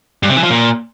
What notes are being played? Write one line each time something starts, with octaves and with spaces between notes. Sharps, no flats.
G2
C3
E3
F3
A#2